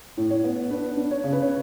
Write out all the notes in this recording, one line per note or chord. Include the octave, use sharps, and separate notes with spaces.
A2
C#5
B3
D4 B4
D4
C#5
C#3
B4
C#5